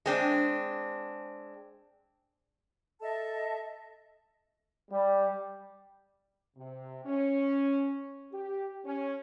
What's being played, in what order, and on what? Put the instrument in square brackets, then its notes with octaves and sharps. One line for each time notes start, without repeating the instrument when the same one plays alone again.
[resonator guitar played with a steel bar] G#3 C4 D4
[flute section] A4 D#5 E5 A5
[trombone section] G3
[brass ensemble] C3
C#4
G4
C#4